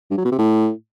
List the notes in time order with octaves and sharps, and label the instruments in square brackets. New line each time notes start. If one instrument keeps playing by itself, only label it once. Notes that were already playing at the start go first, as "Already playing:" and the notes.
[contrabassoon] G2
F#3
B2
C3
A2